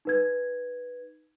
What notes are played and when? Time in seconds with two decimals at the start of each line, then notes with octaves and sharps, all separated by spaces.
0.05 D#4 B4 G#6